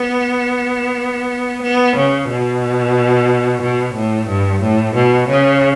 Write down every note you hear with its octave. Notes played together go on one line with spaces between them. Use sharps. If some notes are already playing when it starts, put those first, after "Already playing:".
Already playing: B3
B3
C#3
B2
B2
A2
G2
A2
B2
C#3